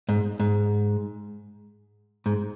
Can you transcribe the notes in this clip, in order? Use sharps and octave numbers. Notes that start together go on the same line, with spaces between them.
G#2
G#2
G#2